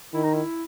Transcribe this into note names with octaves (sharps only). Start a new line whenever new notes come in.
D#3 E4
D#4
E4